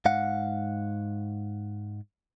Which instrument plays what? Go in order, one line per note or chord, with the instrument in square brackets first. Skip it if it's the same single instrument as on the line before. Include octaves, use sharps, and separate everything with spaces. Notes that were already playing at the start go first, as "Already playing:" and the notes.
[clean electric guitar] G#2 F5 F#5